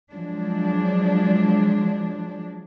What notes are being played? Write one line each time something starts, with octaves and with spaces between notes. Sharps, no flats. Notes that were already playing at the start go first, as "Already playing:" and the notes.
F3 F#3 G#3 D4